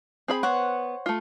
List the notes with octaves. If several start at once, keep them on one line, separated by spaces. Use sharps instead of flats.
C4 G#4 B5
B3 C5 C#5 F#5
A3 F4